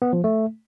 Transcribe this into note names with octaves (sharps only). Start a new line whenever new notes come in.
B3
F3
A3